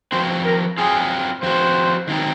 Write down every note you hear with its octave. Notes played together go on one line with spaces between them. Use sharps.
F3 C4 F#4 C5
A#4
F#3 C4 F4 G#4
F3 C4 F#4 C5
D#3 F#3 C4 D#4